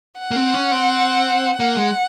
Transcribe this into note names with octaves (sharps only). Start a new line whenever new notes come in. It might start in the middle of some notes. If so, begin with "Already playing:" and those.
F#5
A#3
C4
C#4
C4
A#3 F#5
G#3